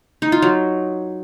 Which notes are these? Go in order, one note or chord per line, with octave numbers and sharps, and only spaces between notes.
D#4
F4
F#3